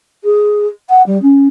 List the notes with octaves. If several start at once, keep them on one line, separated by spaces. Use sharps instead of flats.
G#4
F#5
G3
C#4